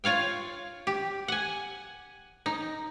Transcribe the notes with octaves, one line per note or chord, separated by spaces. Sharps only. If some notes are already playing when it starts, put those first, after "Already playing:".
F4 C#5 F5 G5
G4
F#5 G#5
D#4